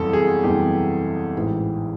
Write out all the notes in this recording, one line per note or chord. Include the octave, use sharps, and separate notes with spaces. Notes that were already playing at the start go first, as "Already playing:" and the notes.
Already playing: F#1 E2 C3 E3 G3 A4
G#4
F#1 E2 C3 E3 G3 G4
A1 G#2 E3